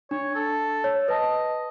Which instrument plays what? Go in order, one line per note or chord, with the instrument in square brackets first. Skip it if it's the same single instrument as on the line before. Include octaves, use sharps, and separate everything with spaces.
[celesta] D4 [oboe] C#5
[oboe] A4
[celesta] C#5
[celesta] B4 A5 [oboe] D#5